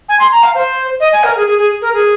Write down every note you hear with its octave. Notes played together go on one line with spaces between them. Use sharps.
G#5
C6
A#5
F5
C5
D#5
G#5
A#4
G#4
G#4
G#4
A#4
G#4